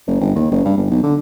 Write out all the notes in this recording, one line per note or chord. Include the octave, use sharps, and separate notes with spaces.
F#1
G1
D#2
F#1
G2
G1
B1
D3